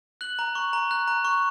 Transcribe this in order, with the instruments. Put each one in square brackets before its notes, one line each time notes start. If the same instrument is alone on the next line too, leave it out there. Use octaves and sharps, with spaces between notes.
[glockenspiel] F#6 F#7
A#5
C#6
A#5
F#6
A#5
C#6